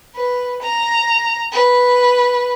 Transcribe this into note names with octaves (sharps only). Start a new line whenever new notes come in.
B4
A#5
B4